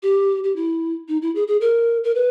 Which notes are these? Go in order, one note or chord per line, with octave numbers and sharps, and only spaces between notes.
G4
G4
E4
D#4
E4
G#4
G#4
A#4
A#4
B4